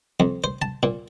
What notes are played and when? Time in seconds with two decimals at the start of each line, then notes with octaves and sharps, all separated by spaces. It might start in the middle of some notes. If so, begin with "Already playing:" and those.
0.20 F2
0.44 C5
0.62 A5
0.83 A#2